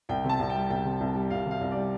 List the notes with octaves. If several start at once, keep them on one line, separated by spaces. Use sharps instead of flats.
C2 G5
C3
A5
C2
G5
G3
C2 G5
C3
C2
G3
C2 F5
C3 F5
C2
G3 D5